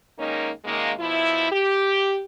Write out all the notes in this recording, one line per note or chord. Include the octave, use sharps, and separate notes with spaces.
D#3 G#3 A#3 C#4 D#4
F#2 D#3 G#3 A#3
B2 F3 E4
G4